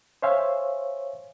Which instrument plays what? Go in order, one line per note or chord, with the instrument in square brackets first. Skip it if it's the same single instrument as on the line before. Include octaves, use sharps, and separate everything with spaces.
[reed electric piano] C5 C#5 E5 F5 G#5